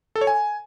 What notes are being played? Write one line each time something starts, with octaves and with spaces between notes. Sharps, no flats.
A4
C#5
G#5